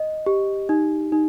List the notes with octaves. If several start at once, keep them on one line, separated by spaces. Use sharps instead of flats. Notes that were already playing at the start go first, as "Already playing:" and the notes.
Already playing: D#5
G4
D#4
D#4